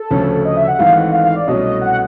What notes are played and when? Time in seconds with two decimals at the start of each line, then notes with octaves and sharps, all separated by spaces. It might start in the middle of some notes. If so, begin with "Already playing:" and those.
Already playing: A4
0.11 D2 C#3 F3 A3 C#4
0.45 D#5
0.56 E5
0.67 F#5
0.79 G#1 G#2 E3 A3 F5
0.96 F#5
1.12 F5
1.24 F5
1.36 D5
1.47 C2 B2 F#3 A3 C#4 D#5
1.81 F#5